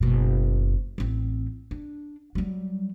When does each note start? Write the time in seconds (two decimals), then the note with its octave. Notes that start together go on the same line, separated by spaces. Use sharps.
0.01 F#1 B2
0.98 A1 C4
1.71 D4
2.35 F#3 G3